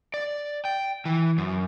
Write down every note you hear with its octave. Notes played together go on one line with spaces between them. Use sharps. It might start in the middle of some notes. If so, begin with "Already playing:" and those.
D5
G5
E3
F#2